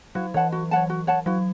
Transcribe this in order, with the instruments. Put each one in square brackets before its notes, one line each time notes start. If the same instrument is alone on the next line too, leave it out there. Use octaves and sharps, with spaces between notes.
[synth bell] F#3 [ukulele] F#4
[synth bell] E3 [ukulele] C#5 F#5 A5
[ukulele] F#4
C#5 F#5 A5
F#4
C#5 F#5 A5
[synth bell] F#3 [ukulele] F#4